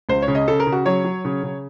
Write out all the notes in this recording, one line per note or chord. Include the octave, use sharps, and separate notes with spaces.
C#2 C5
C#5
C#3
D#5
C#3 A4
A#4
C#3
F#4
F#3 C#5
F#3
C#3
C#3